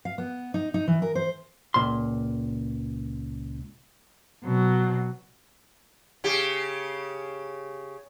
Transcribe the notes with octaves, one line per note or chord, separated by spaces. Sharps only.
F5
B3
D#4
D#4
E3
A#4
C5
C#2 A#2 C6
B2 F#3
C#3 G4